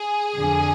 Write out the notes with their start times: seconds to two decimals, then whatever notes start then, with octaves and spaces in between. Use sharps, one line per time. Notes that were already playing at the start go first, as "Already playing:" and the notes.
Already playing: G#4
0.39 F2 D3 F3